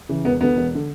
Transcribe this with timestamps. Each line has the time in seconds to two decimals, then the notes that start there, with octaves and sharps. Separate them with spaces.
0.09 C#3 E3
0.25 E1 B3
0.40 D2 D3 B3
0.57 E1
0.75 D3